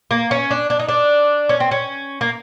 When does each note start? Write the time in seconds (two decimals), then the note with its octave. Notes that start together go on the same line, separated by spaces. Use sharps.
0.11 A#3
0.31 C#4
0.51 D4
0.70 D4
0.79 D#4
0.88 D4
1.49 C#4
1.60 C4
1.71 C#4
2.21 A#3